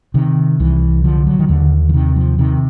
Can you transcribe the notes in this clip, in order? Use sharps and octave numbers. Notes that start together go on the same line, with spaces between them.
C3 D#3
C2 E3
D3 F3
F#3
D#3
D#2 D3
E3
C3 D#3
F3
C3 D#3